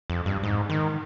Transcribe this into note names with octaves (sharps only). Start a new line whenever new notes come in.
F2
G2
G#2
D#3